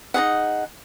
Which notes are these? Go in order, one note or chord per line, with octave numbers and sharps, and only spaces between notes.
D#4 F4 G#4 F#5